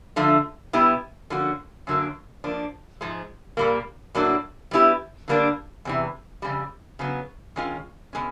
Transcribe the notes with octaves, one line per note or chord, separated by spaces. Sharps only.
D3 F3 A3
B2 G3 B3 E4 G4
D3 F3 A#3 C#4 F#4
F#2 D3 F#3 A#3
F3 A#3 D4
G#2 F3 G#3
A#2 G3 A#3
A2 F#3 A#3 D4 F#4
G3 B3 E4 G4
D3 G3 A#3 D4
E2 C3 E3
F2 C#3 G3
C#3 F#3 B3
D#3 G#3 C#4 F4
B2 G#3 C#4